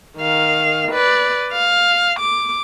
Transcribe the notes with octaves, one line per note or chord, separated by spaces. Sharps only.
D#3 F5
B4 D5
F5
D6